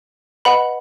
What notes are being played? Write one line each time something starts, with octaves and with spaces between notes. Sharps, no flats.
B4 D#5 F#5 B5